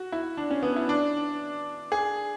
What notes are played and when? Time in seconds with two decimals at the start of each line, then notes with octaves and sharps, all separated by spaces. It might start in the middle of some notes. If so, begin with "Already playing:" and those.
Already playing: F#4
0.12 E4
0.37 D4
0.51 C#4
0.63 B3
0.76 E4
0.89 D4
1.92 G#4